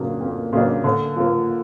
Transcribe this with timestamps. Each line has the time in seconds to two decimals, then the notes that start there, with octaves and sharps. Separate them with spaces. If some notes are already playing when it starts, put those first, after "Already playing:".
Already playing: F2 C#3 F#3 A#3 D4
0.21 F2
0.53 C#3 F#3 A#3 D4
0.84 D3
1.16 F3 A#3